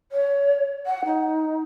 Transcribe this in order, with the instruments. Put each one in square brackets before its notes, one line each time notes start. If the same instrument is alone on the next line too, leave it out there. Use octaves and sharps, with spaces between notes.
[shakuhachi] C#5
F#5
D#4